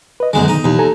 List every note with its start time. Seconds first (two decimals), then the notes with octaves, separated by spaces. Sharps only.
0.20 B4 D#5
0.33 B1 F#2 D3 D#3 G#3 B3
0.48 D#4
0.64 D#2 B2 E3
0.79 A4 G#5 A#5